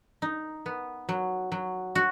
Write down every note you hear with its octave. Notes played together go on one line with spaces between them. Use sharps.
D#4
B3
F#3
F#3
F#4